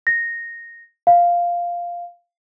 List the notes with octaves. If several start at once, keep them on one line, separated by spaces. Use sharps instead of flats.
A#6
F5